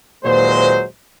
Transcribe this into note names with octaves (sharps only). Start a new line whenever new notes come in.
D#2 A#2 F#3 G#3 B4 C5